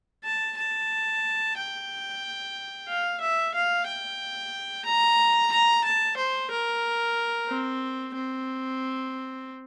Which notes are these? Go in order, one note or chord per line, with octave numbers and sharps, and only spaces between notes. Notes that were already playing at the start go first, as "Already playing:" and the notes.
A5
A5
G5
F5
E5
F5
G5
A#5
A#5
A5
C5
A#4
C4
C4